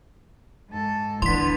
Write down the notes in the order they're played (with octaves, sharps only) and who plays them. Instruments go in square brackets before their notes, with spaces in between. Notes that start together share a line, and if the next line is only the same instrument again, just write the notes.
[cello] G#2 A4
[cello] D3 B3 [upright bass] E3 [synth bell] C6 B6